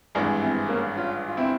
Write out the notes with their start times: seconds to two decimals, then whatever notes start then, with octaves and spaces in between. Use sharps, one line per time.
0.15 G#1 G2 E3 G#3
0.42 C4 E4
0.69 A#3 C#4
0.96 C#4 F4
1.28 F4
1.37 C4 E4